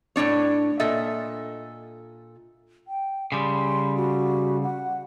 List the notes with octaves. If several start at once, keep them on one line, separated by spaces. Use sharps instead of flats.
A2 E3 D4 C#5
A#2 A4 D#5 E5
G5
C#3 G3 C6
F#4
F#5